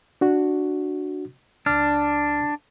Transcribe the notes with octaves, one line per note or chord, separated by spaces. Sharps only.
D4 F#4
C#2 D4 F6